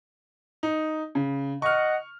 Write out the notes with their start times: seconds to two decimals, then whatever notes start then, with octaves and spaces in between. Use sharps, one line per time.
0.63 D#4
1.15 C#3
1.62 D#5 F#5 C#6 F6